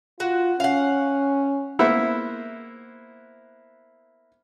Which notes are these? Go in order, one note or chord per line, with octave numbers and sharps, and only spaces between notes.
F4 F#4
C#4 F5 F#5
A#3 B3 E4 C5 E5 F#5